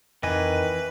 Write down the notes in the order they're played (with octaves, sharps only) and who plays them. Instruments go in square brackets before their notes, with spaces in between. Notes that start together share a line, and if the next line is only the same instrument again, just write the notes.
[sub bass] F2 [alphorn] D#3 [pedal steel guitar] E3 D#5 G#5 [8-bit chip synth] B4